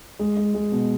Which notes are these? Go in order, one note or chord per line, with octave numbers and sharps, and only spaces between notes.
G#3
G#3
G#3
B2